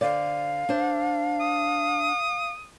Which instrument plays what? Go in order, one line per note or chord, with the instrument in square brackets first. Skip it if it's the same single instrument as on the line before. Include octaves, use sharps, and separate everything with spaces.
[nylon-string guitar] D3 C5 D5 [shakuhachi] F5
[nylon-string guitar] D4 C5
[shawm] D#6